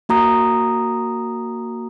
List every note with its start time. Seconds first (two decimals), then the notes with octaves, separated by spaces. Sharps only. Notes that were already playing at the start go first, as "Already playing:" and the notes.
0.09 A#3 F#4 A#5 D#6